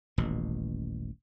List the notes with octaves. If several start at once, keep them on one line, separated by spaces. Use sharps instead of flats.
D#1 A1 B2